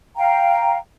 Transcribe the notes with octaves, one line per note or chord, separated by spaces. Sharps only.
F5 G5 A#5